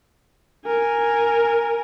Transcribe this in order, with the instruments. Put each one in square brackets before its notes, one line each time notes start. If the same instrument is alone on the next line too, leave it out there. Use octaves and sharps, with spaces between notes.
[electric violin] A#4 G#5